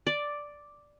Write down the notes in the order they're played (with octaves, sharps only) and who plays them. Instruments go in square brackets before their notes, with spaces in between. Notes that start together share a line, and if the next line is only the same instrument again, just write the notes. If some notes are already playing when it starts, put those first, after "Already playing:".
[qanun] D5